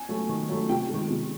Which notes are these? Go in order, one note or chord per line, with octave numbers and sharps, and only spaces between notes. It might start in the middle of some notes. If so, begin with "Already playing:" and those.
Already playing: G#5
F#3 A3
D#3
F#3 A3
C3 G5
D#3 G#3
C3